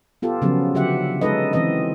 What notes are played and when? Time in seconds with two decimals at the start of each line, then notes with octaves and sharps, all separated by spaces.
0.22 B3 F4 G4 A4
0.42 C#3 F3 F#3 B3 C#4
0.75 D3 F#3 G4 E5 F#5
1.21 G#3 C#4 D#4 A4 B4 D#5
1.53 E3 C4 B4 D#5